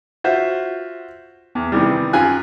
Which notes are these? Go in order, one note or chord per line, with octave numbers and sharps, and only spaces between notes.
F4 F#4 C5 E5
E2
C3 D#3 E3 G3
F#2 F4 G#5 F#6